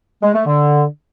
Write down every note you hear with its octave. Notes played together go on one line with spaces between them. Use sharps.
G#3
A3
D3